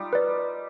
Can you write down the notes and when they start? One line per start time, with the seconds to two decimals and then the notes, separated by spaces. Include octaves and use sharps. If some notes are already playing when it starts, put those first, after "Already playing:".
Already playing: G3 D#4 F4
0.13 B4 D5